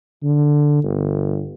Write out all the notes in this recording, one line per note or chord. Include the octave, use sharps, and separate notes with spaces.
D3
G1